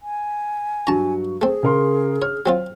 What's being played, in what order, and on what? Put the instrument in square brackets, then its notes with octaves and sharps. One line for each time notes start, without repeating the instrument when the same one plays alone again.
[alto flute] G#5
[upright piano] G2 F#3 C#6 [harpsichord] A5 A#5
[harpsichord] A3 C4 [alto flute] G#4
[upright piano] C#3 A#4 C6
[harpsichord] C#5 [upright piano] F6
[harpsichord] F#3 C4 F4